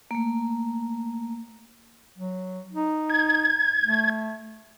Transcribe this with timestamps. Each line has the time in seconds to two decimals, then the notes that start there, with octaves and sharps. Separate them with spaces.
0.11 A3 A#3
2.18 F#3
2.73 D#4
3.10 G#6
3.85 A3